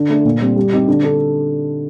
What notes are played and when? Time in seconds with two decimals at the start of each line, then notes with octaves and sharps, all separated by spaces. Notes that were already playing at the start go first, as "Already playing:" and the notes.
Already playing: D3
0.10 A3 D4 A4
0.25 A#2
0.41 G3 C4
0.56 G3
0.73 C4 D#4 G4
0.88 D3
1.04 D4 A4